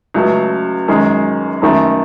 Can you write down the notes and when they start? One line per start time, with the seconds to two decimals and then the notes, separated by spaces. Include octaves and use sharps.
0.14 C#2 C#3 F#3 A3
0.88 F#2 D#3 G#3
1.62 F#2 D#3 A3